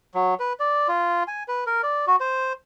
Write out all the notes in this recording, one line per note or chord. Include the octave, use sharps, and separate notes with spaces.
F#3
B4
D5
F4
G#5
B4
A#4
D5
F#4
C5